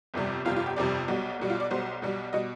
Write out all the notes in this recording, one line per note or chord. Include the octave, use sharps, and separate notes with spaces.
G1 F2 C3 G3
G1 F2 C3 G3 F4
F4
G4
G1 F2 C3 G3 D5
B1 B2 G3
B1 B2 G3
F4
D5
B1 B2 G3 C5
B1 B2 G3
B2 G3 D#5